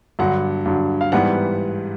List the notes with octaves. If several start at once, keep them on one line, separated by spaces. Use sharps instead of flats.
G2 D3 F#3 F#5
G2 D3 F#3
F5
G#2 E3 G3 B3 F#5